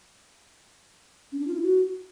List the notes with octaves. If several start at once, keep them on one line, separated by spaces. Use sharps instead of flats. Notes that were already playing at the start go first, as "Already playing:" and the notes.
C#4
D4
F4
E4
F#4